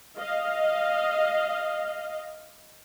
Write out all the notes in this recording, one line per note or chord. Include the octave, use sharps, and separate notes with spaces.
D#5 F5